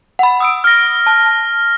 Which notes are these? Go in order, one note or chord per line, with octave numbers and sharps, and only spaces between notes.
F#5 B5
D#6 E6 D7
F6 A#6
A5